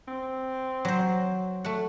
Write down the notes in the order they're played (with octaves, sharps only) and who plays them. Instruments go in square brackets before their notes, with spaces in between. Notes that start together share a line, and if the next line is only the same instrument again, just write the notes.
[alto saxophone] C4
[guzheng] F#3 C5
A3 F#5